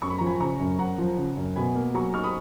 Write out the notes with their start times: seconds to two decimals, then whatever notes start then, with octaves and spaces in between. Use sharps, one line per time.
0.02 F#2 C#6
0.10 B5
0.18 F3 A#5
0.26 G#5 B5
0.40 C#3 A#5 C#6
0.60 F#2
0.79 F#2 F#5 A#5
0.98 F3
1.17 C#3
1.37 F#2
1.56 B2 G#5 B5
1.75 A#3
1.94 F#3 A#5 C#6
2.14 D#4 C#6 F6
2.24 B5 D#6